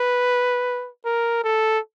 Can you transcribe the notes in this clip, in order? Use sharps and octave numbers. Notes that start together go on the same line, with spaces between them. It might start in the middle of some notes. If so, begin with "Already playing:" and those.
Already playing: B4
A#4
A4